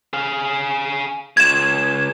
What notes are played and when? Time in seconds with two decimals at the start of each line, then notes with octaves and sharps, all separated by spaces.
0.13 G#4 F5
1.37 C#2 G#6 E7